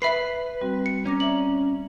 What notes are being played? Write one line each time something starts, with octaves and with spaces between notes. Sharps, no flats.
B4 E5 B5 C7
G3 C4 F#4
C#7
C#4 A#5 D6 A#6
D5 E5 A#5 F#7